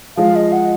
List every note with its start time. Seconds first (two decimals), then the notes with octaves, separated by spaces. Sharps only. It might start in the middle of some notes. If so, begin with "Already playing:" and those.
0.17 F3 G#3 F5
0.36 D#5
0.53 F#5